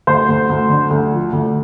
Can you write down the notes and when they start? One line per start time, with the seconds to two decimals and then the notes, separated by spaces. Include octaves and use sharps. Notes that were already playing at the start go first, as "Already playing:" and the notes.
0.07 D2 C5
0.29 D2
0.50 D2
0.70 D3
0.91 D2
1.12 F3
1.33 D2